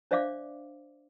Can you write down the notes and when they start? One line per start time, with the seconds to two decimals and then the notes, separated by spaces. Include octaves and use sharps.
0.11 D4 C5 D5 E5 F5 D6